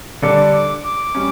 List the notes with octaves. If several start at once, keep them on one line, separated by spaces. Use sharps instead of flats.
D3 G3 D4 A4 D6
D6
D6
G3 C#4